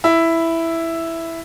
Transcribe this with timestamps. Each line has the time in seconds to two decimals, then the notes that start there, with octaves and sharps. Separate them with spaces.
0.04 E4